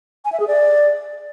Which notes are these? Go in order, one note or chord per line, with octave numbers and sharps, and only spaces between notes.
G#5
E5
G#4
D5